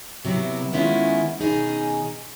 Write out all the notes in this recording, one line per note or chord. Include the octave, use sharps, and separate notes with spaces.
C3 F#3 B3 E4
D#3 G#3 B3 C#4 E4 F4
B2 D#3 C#4 D#4 G#4